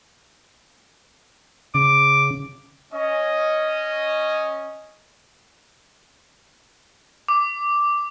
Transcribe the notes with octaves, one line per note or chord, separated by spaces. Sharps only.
C#3 D6
C#4 D#5
D6